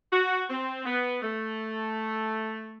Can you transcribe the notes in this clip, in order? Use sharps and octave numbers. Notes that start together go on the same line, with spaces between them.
F#4
C4
B3
A3